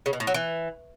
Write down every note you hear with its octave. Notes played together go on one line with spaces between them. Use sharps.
C#3
B2
A2
F#3
E3